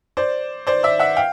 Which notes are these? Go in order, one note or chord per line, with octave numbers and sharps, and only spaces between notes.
C5 D5
C5 D5
D5 E5
E5 F#5
F5 G5